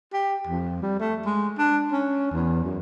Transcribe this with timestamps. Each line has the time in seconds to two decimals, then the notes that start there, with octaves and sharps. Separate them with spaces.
0.13 G4
0.48 F2
0.83 G3
1.00 A3
1.25 G#3
1.58 D4
1.92 C#4
2.32 E2
2.64 F#2